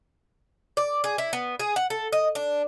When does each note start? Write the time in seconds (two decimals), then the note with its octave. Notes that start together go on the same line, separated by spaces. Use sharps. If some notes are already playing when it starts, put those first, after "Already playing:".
0.77 D5
1.04 G#4
1.18 E4
1.33 B3
1.60 G#4
1.76 F#5
1.90 A4
2.13 D#5
2.35 D4